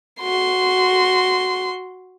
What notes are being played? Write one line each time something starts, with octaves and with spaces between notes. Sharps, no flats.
F#4 C6